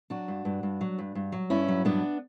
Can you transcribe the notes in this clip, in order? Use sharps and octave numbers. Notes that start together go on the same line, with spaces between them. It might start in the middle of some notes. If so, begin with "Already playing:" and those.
F#3 D4 F#4
G2
G2
G2
F#3
G2
G2
F#3
G2 C#4 E4
F#3
G2 B3 D4